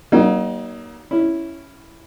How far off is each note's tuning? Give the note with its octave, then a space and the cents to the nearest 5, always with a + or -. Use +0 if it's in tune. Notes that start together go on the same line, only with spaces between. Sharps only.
F#3 +45 A#3 +30 D#4 +0
C#4 +0 E4 +0